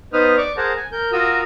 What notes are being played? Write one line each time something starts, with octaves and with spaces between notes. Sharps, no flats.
B3 D#4 B4 C5 D#6 F6
D5 C#6 D6
G#4 A#4 C5 F#5 A5 A#5
G#5
A#4 G6
F4 F#4 A#4 A#5 D#6 E6